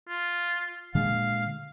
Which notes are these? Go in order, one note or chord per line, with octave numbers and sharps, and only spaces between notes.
F4
A#2 D3 G#3 F5